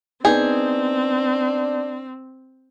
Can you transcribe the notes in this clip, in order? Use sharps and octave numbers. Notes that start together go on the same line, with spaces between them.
B3 C4 D4 D#4 G#4 G6